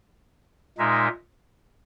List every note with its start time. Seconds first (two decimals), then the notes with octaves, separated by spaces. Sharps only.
0.78 A#2 G#3 D#4 A#4 E5